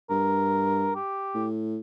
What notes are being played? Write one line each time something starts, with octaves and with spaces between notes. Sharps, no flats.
G2 A#4
G4
A2